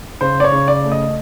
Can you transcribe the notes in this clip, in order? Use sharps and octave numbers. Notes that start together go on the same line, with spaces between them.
C#3 C5
D5
C#5
C#3
D5
A3
D#5